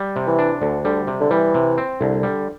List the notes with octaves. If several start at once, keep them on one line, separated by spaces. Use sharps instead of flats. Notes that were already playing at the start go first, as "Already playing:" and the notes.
Already playing: G3
C3
E3
D4
D2 D3
D3 G3
C3
D3
E3 G3
C3
C4
C2 D3
G3